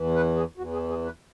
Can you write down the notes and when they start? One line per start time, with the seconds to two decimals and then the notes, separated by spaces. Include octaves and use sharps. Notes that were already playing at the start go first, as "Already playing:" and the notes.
Already playing: E2 E3
0.15 B4
0.36 G#4
0.57 E2 F#4
0.61 E3
0.73 G#4
0.90 G#4
1.05 B4